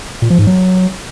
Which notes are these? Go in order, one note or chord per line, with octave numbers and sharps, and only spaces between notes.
A#2
F3
G#2
F#3